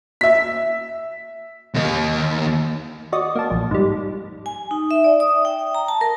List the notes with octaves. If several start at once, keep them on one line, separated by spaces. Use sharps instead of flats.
E5 B6
D#2 A#3
F#4 D5 D#5
A#3 A5
A#1
G#2 G3
G#5
D#4
E5
D5
D#6
G5
A#5
A5
A#4